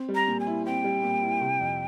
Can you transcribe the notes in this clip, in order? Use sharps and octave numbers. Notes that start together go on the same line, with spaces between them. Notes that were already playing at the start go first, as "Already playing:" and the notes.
Already playing: C4
G3
A#5
A#2
G#5
E4
C4 G5
G3
A#2
E4
C3
F2